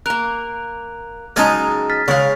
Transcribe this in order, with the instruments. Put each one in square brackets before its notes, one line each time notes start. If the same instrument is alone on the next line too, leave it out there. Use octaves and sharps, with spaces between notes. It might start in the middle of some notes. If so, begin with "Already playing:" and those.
[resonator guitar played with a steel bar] A#3 A#4 [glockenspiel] F#6 F7
[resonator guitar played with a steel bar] C#3 F#3 D#4 [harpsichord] G#3 G#5 A5 [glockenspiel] F6
[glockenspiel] F6 A6 B6
[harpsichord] C#3 [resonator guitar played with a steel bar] G#3 F5 [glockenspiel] C#6 A6